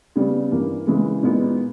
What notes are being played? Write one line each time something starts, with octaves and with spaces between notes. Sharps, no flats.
C#3 G3 B3
G2 E3 A#3
C#3 E3 G#3
A#2 G#3 B3 D#4